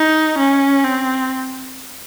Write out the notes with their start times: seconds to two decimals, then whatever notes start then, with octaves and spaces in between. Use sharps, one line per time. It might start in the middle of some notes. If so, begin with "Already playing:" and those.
Already playing: D#4
0.38 C#4
0.85 C4